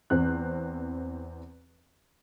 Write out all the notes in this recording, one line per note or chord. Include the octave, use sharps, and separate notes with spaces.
E2 C4 F#6